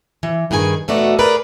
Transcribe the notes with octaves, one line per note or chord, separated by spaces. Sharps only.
E3
G2 D#3 G#4 G#5
E2 B2 A3 D#4 F#4 D5
G#4 A#4 B4 D5